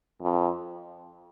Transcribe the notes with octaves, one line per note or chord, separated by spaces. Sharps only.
F2